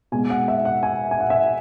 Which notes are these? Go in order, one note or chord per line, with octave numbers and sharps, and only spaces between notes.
B2 G#3 B3 G#5
F#5
E5
F#5
G#5
G#5
F#5
E5